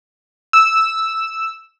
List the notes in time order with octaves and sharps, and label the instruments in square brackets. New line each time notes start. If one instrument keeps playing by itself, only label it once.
[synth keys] E6